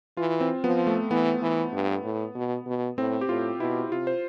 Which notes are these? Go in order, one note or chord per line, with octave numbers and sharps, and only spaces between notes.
E3 F4
C4
F3 B3
A3
E3 B3
E3
G2
A2
B2
B2
A2 C4
G4
A2 F4
B2 E4
C3 F4
C5